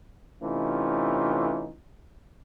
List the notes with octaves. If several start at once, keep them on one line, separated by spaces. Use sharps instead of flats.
C3 E3 A3 C#4 D#4 F4